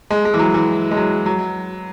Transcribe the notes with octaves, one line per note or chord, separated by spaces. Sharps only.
G#3
G#3
E3
F#3
E3
G#3
F#3
F#3